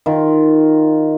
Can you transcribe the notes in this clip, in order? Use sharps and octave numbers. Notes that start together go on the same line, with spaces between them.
D#3 F4